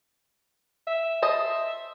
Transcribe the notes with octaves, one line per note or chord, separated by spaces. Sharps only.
E5
C5 D#5 A5